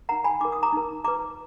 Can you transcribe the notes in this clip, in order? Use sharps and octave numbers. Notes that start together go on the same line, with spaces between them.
D#4 A#4 F#5 A#5
G#5 B5
D#4 A#4 D6
D#6
A#5 D6
D#4 A#4
F4 B4 A#5 D6